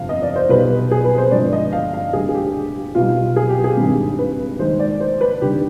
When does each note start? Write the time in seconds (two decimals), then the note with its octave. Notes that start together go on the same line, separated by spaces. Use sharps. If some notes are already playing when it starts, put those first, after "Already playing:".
Already playing: G1 F2 C3 F3 F5
0.09 D#5
0.22 D5
0.36 C5
0.49 B1 B2 G3 B4
0.91 G#4
1.05 B4
1.18 C5
1.31 G1 G2 F3 G#3 D5
1.53 D#5
1.72 F5
1.93 F5
2.13 D2 D3 G3 G#4
2.29 G#4
2.34 G4
2.95 B1 B2 G3 F4
3.36 G#4
3.49 G4
3.64 G#4
3.77 G#1 G2 D#3 G3
4.19 B4
4.59 D#2 D#3 G#3 C5
4.80 D5
5.00 C5
5.21 B4
5.41 D#2 D3 G3 G4